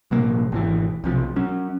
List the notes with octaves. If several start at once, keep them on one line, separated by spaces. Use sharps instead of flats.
A1 B2 F#3 A#3
G#1 B2 D#3 E3
B1 C3 F3
F#3 C#4